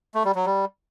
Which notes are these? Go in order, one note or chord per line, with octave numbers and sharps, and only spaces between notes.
A3
G3
F#3
G3